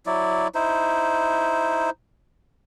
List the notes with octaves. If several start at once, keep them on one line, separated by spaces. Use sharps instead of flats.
F#3 E4 D5
D#4 E4 C5